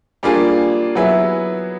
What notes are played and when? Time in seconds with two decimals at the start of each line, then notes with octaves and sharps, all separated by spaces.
0.23 G3 A#3 D4 F4 G#4
0.95 F#3 B3 E4 G#4